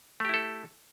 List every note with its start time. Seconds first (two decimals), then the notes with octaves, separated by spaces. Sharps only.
0.20 A3
0.25 G4
0.29 E4
0.34 A4